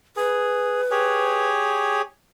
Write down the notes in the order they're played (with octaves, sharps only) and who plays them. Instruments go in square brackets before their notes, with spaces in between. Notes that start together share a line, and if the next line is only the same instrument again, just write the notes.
[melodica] G#4 [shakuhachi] B4
[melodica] G4 G#4 C#5